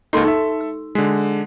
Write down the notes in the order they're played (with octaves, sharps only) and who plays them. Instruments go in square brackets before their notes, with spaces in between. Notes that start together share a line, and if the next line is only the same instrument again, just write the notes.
[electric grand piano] C#2 A#3 D#4 [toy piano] G4 A4 C6
[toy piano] D#4 [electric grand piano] A4 E5
[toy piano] E6
[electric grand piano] D3 G#3 [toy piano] F#4